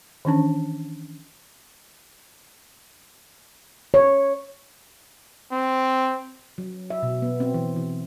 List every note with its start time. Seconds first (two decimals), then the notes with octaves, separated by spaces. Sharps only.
0.25 D#3 E3 C#4 D4 A5
3.94 C#5
5.52 C4
6.58 F#3
6.90 E5
7.03 B2
7.22 B3
7.40 C4
7.54 E3
7.76 E3